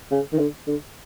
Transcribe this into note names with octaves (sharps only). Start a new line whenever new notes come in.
C#3
D#3
D3
D3